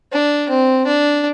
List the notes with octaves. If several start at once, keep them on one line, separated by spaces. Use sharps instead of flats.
D4
C4
D4